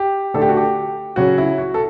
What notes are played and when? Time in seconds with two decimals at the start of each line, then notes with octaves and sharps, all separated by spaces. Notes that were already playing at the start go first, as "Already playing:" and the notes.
Already playing: G4
0.34 D3 A3 D4 A4
0.41 G4
0.49 F#4
0.57 G4
1.16 C#3 F#3 C#4 F#4
1.38 E4
1.58 F#4
1.74 A4